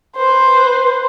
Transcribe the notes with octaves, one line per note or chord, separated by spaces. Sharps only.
B4 C5